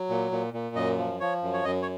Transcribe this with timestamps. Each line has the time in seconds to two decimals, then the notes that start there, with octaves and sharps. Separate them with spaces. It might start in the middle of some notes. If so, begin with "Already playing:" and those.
Already playing: F#3
0.09 A#2
0.31 A#2
0.54 A#2
0.76 F#2 D#5
0.98 F3
1.20 F3 C#5
1.43 F#2
1.53 C#5
1.65 F#2 D#5
1.82 C#5